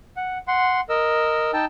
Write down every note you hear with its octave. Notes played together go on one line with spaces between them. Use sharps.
F#5
F#5 C6
A#4 D#5 E6
D#4 G5 A5 E6